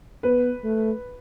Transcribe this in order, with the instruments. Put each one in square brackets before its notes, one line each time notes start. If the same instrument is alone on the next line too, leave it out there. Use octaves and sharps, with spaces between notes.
[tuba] B3 [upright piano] B4
[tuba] A3